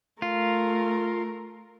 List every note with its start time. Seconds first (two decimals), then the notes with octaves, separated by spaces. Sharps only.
0.22 A3 F4 A#4